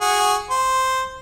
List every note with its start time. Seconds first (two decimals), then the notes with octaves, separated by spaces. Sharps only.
0.01 F#4 G#4
0.50 C5